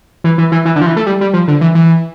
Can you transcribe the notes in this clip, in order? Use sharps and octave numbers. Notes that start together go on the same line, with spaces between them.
E3
E3
E3
E3
D3
F3
E3
A3
G3
G3
F3
D3
E3
E3